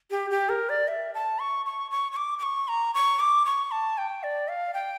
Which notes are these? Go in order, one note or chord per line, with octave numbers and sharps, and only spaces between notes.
G4
G4
A#4
D5
E5
A5
C#6
C#6
C#6
C#6
D6
D6
C#6
A#5
C#6
D6
C#6
A5
G5
D5
F5
G5